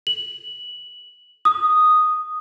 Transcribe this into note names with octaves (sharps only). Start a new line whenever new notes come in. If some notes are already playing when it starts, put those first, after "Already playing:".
F#7
D#6